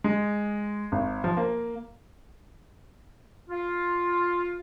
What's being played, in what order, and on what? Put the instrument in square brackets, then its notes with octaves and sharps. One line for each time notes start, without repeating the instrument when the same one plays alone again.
[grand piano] G#3
G#1
F3
A#3
[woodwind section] F4